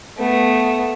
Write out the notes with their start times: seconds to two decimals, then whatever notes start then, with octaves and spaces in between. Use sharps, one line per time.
0.18 A3 B3